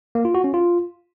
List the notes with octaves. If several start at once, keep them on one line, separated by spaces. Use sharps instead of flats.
A#3
F4
F#4
C#4
F4